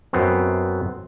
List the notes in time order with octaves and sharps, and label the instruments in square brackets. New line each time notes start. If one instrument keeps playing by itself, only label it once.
[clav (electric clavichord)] F#2 B3 C4